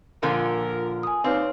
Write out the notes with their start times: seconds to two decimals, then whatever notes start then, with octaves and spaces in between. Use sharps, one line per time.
0.23 A#2 D3 F3 A#4
1.03 G#5 D#6
1.24 D#2 C4 D#4 B4 C#5 D5 F5